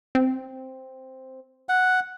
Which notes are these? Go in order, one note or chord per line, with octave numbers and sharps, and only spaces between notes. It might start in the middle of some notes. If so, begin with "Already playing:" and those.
C4
F#5